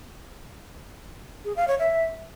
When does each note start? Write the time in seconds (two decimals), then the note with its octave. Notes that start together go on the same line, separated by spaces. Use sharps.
1.45 G#4
1.56 F5
1.68 C#5
1.79 E5